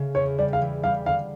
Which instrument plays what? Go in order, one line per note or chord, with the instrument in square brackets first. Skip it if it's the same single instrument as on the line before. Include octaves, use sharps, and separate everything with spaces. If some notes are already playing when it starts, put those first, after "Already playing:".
Already playing: [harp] C#3 A3
[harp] E2 [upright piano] C#5
[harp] G3 [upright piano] D5
[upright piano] F5
[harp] E3
[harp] G3 [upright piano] F5
[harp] D3 [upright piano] F5